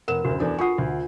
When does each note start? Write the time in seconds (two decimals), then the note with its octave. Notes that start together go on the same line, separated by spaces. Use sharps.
0.08 F1 A#4 F#5 E7
0.25 F#1 D2 F#4
0.40 E2 D4 A4
0.59 D4 F4 F#5 C#6 D#6
0.78 D2